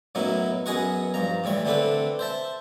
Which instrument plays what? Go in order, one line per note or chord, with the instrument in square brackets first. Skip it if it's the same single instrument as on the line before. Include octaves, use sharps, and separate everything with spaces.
[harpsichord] F#2 A2 F#3 B3 D#4 E4
F#2 B3 G#4 D#5 F#5 C#6
G2 F3 A#5
A2 E3 G3 C#6
D3 A3 C4 D4 A4 B4
C5 E5 A5